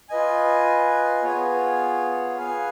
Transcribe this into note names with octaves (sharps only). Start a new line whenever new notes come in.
F4 B4 D#5 G#5
B3 F4 G#4 C#5
G#4 B4 F5 G#5